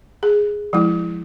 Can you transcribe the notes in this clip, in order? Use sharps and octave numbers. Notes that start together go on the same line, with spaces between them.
G#4
F3 G#3 E4